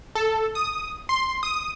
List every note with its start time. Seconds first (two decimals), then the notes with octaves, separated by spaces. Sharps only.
0.15 A4
0.55 D#6
1.09 C6
1.43 D#6